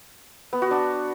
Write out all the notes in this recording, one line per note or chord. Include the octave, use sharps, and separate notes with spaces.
B3
F#4
D4